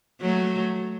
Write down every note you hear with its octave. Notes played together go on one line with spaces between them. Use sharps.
F#3 A3